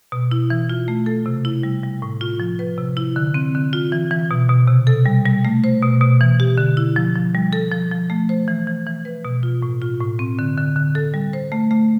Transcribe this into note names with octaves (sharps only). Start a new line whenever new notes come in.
B2
E4
E3
F4
A3
A4
C3
E4
G3
G3
A2
F4
F3
B4
C3
E4
D3
C4
D3
F4
E3
E3
B2
B2
C3
A4
G3
G3
A3
C5
B2
B2
E3
G4
D3
E4
F3
F3
G3
A4
F3
F3
A3
C5
E3
E3
E3
B4
B2
F4
A2
F4
A2
C4
D3
D3
D3
A4
G3
C5
A3
A3